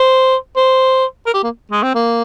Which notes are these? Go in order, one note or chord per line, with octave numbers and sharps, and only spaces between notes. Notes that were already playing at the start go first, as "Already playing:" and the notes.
Already playing: C5
C5
A#4
G4
A#3
G#3
C4
A#3